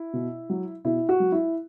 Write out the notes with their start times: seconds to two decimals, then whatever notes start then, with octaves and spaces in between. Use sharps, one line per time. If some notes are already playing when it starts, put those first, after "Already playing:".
Already playing: E4
0.13 B2
0.50 F#3
0.84 B2 E4
1.09 F#4
1.20 F#3
1.32 E4